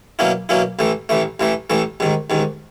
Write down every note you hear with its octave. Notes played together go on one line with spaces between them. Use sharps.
B2 F#3 A#3 C#4 E4
B2 F#3 A#3 C#4 E4
A1 A2 E3 A3
A1 A2 E3 A3
A1 A2 E3 A3
A1 A2 E3 A3
A1 G#2 D#3
A1 G#2 D#3